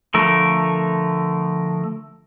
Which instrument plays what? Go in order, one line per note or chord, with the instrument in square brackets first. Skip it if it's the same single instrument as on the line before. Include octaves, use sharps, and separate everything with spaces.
[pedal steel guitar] D3 F3 A3 A#4